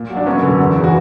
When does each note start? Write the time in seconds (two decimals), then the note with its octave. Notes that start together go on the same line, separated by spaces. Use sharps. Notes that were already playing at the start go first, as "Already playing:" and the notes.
Already playing: A#2
0.10 F#3
0.17 D4
0.26 F#2 B3 C#4
0.43 D3 F#3
0.59 E2
0.76 C#3 E3
0.84 F#4